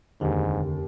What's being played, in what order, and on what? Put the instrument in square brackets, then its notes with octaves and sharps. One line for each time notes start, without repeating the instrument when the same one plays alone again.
[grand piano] F1 D#2 [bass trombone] G#2 [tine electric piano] D3